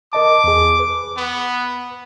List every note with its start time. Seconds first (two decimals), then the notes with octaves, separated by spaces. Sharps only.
0.13 A#4 D#5 A5 D6
0.44 E2 G#4
0.80 B4
1.17 B3